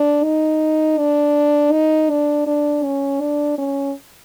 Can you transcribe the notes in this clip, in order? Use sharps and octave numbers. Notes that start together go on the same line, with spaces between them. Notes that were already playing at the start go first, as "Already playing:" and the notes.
Already playing: D4
D#4
D4
D#4
D4
D4
C#4
D4
C#4